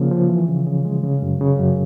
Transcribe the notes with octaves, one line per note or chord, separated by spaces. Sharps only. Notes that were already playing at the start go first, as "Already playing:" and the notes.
Already playing: C#3 F3 A#3
F3
E3
C#3
C#3
G#3
C#3
F#2
C#3
F#2